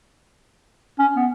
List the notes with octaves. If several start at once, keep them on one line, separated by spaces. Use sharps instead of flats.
C#4
B3